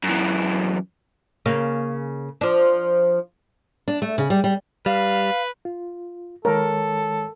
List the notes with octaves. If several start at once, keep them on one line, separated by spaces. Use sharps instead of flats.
F#2 E3
C#3 A#3
F3 D4
D4
A3
C#3
G3
G3
G3 B4 F5
F4
D#3 G#3 A4 A#4 C#5